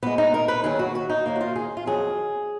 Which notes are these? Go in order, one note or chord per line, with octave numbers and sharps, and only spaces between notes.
A#2 G#3 B3
D#4
A#4
B4
D#2 D#3 F#3 G#4
F#4
F#4
D#4
D#2 D#3 F#3 A#3
F#4
F4
G#4
F4
F2 D#3 F#3 G#4